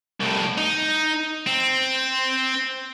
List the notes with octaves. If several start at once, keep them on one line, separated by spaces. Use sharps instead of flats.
C2 A2
D#4
C4